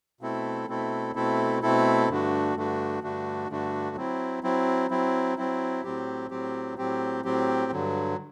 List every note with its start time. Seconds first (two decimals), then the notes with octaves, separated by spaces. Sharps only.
0.21 B2 A3 C4 E4 A4
0.68 B2 A3 C4 E4 A4
1.15 B2 A3 C4 E4 A4
1.62 B2 A3 C4 E4 A4
2.09 G2 D3 A3 D4 F#4
2.55 G2 D3 A3 D4 F#4
3.03 G2 D3 A3 D4 F#4
3.50 G2 D3 A3 D4 F#4
3.96 F#3 C4 E4
4.43 F#3 C4 E4
4.90 F#3 C4 E4
5.37 F#3 C4 E4
5.84 A2 F#3 C4 G4
6.30 A2 F#3 C4 G4
6.78 A2 F#3 C4 G4
7.24 A2 F#3 C4 G4
7.72 G2 D3 F#3